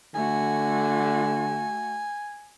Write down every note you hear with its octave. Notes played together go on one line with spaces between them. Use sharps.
D3 A3 F#4 G#5